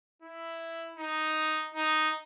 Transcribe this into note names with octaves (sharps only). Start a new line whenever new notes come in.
E4
D#4
D#4